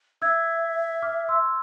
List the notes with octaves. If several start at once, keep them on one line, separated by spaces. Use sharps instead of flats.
E5 E6 G#6
D6 F6
C6 E6